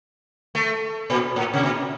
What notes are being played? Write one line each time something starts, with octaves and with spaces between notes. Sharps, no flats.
A3
A#2
A2
C3
A#2